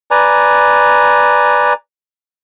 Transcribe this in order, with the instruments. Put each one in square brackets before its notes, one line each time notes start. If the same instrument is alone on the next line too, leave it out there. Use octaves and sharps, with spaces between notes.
[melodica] B4 D5 G#5 A#5